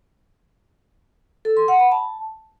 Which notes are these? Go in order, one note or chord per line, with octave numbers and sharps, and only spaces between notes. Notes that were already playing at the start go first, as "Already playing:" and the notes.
A4
C6
F#5
B5
A5